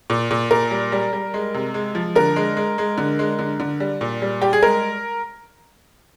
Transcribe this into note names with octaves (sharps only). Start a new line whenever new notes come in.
A#2
A#2
A#2 A#4
G3
G3
G3
G#3
C3
G#3
F3
D3 A#4
G#3
G#3
G#3
D3
G#3
D3
D3
G3
A#2
G3
G3 G4
G#4
G#3 A#4